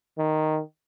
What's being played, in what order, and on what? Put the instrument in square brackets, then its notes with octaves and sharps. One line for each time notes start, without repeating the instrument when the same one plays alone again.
[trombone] D#3